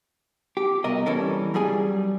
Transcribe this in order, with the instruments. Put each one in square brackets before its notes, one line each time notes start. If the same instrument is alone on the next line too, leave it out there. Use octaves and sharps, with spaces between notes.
[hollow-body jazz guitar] G4
C2 B2 A#4 D#5
E3 G3 C#4 A4 A#4
F#3 G3 G#4 G#5